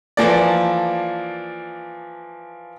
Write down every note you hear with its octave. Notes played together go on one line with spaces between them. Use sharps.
E3 F3 A#3 A4 D5